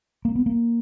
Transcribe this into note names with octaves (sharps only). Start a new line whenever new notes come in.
A#3
B3
A#3